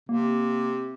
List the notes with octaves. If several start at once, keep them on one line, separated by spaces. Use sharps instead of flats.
C3 A#3